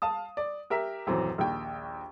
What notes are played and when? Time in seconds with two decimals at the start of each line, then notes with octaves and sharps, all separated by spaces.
0.02 F5 A5 D#6
0.37 D5
0.70 G4 A#4 E5
1.07 D#1 F#2 E3 C4
1.38 A#1 D#2 G5